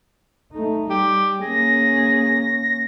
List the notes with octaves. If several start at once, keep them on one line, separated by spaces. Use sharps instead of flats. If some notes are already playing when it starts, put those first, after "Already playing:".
A3 D#4
G3 G4
A#3 C#4 G#4 A#6